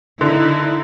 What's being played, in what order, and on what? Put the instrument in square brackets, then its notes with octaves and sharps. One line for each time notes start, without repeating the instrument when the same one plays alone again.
[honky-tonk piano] D3 [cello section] D#4 E4